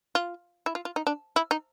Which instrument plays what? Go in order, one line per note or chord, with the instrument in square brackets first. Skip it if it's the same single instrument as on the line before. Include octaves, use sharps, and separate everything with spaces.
[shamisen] F4
E4
F4
F4
D#4
D4
E4
D#4